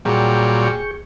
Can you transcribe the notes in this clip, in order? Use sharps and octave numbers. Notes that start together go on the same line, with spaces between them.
A#2 F#3 G3 G#4 G5 C#6